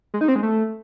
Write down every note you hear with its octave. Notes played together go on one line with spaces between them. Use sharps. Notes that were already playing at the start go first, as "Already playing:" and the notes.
G#3
D#4
C4
G#3
A3